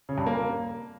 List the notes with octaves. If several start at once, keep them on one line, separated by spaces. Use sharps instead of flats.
C#3
G2
A#3